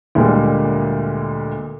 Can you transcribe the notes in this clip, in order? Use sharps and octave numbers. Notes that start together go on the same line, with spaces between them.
D2 A#2 G3 G#3 A#3